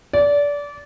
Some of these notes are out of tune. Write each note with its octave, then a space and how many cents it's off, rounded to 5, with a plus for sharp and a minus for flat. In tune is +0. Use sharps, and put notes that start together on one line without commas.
D5 -25